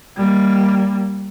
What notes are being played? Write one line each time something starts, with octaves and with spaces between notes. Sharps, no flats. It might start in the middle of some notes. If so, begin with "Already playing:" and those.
G3 A#3